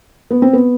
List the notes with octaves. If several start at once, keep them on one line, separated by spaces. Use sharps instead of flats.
B3
C4
B3